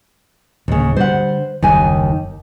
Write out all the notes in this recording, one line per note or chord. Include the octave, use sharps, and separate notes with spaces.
D1 D#2 C#3 A#3
D3 G3 C5 F#5
F#1 D#2 D#3 F#3 G3 G#5